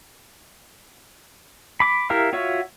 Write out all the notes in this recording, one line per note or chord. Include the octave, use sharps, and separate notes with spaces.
B5 D6
E4 G4 A#4 E5 F5
F4 F#4 C#5 E5